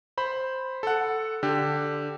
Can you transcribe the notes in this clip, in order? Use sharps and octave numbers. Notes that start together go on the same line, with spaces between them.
C5 B5
A4 F#5
D3 G4